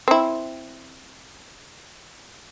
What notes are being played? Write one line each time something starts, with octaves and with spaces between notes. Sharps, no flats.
C4 E4